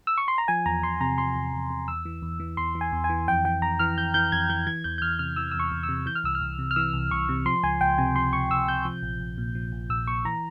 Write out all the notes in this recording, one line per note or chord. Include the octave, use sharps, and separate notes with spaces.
E6
C#6
C6
A#5
F3 G#5
E2 A#5
E2 C6
C3 A#5
F3 C6
E2
E2
C3
E2 E6
E3
E2
E3
E2 C6
E3
G#5
E2
G#5
E3
F2 G5
E3 G5
F2 A#5
E3 F6
F2 G6
E3 G6
F2 G#6
E3 G6
E3 G#6
E2 G6
G6
E2 F6
C3 F6
E3 E6
E2 E6
C#6
E2
E6
C3
E3 G6
F6
C2 E6
F6
C2
C3
F6
E3 E6
C2
C2 C#6
C3
F3 C6
C#2 G#5
C#2 G5
C3 G#5
F3 C6
C#2 C#6
C#2 E6
C3 G6
F3
A#1
A#1
A#2
F3
A#1
A#1 E6
A#2 C#6
E3 A#5